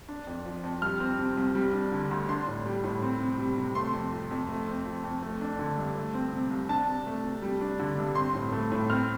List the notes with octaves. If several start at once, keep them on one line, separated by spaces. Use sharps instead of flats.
D4
F2
F3
F2
G3 F6
C4
C3
C2
G3
D4
D3
D2
D4 C6
A2
G3
A2
C4
C3
G3
C3
A3 C6
F2
F3
F2
A3
C4
F3
F2
A3
D4
D3
G2
A3
C4
C3
C2
D4 A5
C3
A3
C3
G3
D4
D3
G2
C4 C6
A2
A3
A2
C4 F6